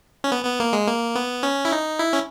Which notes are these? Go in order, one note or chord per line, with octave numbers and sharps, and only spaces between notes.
C#4
B3
B3
A#3
G#3
A#3
B3
C#4
E4
D#4
E4
C#4